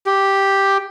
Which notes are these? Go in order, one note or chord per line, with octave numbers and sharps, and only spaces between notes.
G4